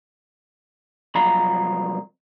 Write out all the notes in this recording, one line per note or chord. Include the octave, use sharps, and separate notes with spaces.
C2 F3 F#3 F5 A#5 B5